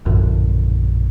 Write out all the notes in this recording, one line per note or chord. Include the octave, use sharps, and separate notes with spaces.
A#1 F#2 A2 D3